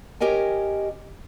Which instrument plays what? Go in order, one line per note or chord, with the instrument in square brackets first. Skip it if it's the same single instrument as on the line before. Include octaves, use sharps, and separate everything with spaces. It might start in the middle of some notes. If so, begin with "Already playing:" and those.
[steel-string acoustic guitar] C#4 G4 A#4 D#5 G#5